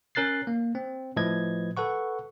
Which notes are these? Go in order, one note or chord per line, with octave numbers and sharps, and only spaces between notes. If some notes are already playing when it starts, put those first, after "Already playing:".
C#4 A#4 F#6 A6 C7
A#3
C4
A2 F3 B4 D#5 G#6
A4 B4 F#5 C#6